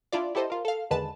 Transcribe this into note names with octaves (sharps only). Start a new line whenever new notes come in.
D4 E4 F4 D5
E4 G4 A4 C5 D#5
F4 A#4
A4 F5
E2 D3 D#3 G#3 B4 A5